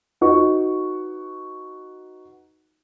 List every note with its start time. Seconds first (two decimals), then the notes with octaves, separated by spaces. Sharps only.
0.21 D#4 F#4 B4 C#6